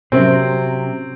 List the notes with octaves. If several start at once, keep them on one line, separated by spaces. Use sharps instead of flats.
C3 F#3 C4 C#4 A#4 C5